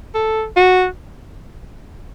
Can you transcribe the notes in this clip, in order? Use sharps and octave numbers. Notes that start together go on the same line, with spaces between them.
A4
F#4